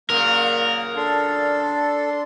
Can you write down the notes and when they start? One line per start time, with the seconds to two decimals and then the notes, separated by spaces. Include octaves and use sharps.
0.10 A#2 C#3 F#3 A#3 A#4 F#6
0.96 D4 A4 C6